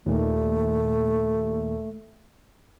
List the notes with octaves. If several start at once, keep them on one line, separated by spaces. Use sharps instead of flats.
D#2 A#2 A3